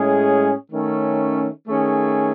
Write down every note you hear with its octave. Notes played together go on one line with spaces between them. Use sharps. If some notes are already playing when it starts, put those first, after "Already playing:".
Already playing: A2 G#3 C#4 G#4
D#3 A3 C#4
D#3 A3 C#4 G#4